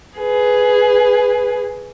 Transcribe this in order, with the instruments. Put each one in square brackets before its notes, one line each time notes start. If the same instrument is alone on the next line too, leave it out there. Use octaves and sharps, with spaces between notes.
[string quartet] G#4 B4